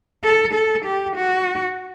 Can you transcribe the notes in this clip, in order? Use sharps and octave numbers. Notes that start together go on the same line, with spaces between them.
A4
A4
G4
F#4